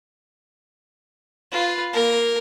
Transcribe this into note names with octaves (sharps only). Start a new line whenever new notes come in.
F4 B4
A#3 A#4